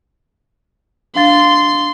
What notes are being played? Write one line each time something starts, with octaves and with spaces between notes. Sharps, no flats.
D4 F5 C6 A6